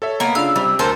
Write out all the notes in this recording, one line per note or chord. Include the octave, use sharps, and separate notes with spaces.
A4 C#5 E5
A#3 B3
C#3 D4 F4 F5 E6
C3 G3
D2 A4 A#4 C5